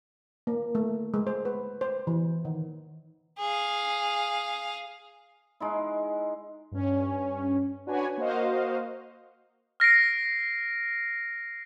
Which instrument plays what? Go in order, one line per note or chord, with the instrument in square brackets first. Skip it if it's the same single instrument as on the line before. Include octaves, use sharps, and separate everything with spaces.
[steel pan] A#3
A3
G#3
C5
B4
C5
E3
D#3
[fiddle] G#4 F5
[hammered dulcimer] G#3 D#4 E4
[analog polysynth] G2 C#4
D4 F#4 B4 C#5 G#5
A#3 F#4 C5 D#5 F5
[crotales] F6 A#6 C7 D7